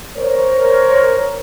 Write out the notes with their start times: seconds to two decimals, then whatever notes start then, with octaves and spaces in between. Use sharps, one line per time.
0.17 A#4 C5 C#5